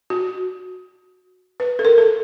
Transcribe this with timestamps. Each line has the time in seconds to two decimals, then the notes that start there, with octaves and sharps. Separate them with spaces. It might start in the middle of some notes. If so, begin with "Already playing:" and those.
0.10 F#4
1.60 B4
1.79 A4
1.85 A#4
1.98 A4